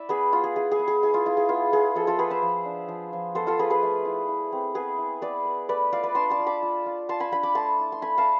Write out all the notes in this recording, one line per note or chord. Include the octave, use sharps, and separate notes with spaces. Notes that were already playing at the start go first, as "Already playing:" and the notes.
Already playing: E4 D5 E5
B3 G#4 B4
B3 F4
G#4
E4 G#4
G#4
B3
G#4
E4 G#4
F4
E4 F4
G#4
B3 F4
B3 G#4
F3 F4 A4
F4 A4
B3 G#4 B4
C5 E5
F3
D4
F3
F3
B3 A4 C5
F4 A4
F3 G#4 B4
G#4 B4
A3
E4
E4
C4
B3 G#4 B4
E4
B3 B4 D5
B3
A3 B4 D5
F4 D5 F5
B4 D5
D4 A5 C6
A5 C6
F4
B5 D6
F4
F4
F4 A5 C6
G#5 B5
D4 G#5 B5
B5 D6
A3 A5 C6
E4
C6
A3 G#5 B5
F5 A5